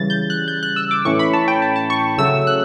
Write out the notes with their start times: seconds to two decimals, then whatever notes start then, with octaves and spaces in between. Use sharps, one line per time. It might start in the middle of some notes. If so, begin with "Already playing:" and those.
Already playing: C#3 E3 G3 A6
0.10 G6
0.30 F#6
0.48 G6
0.63 F#6
0.76 E6
0.91 D6
1.05 A2 E3 A3 C#4 C#6
1.19 B5
1.33 A5
1.48 G5
1.62 A5
1.76 A5
1.90 C#6
2.18 C#3 F#3 A3 C#4 E6
2.47 F#6